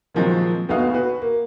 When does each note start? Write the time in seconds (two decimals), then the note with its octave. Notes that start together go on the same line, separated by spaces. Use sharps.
0.14 A#2 D#3 F3 F#3 G#3 C4
0.69 D2 B3 D#4 F#4 F5 D#6
0.94 F#4 B4
1.22 A#3